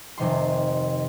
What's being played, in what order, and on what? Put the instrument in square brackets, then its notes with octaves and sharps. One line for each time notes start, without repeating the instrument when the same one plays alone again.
[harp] F1 C3 D#3 C6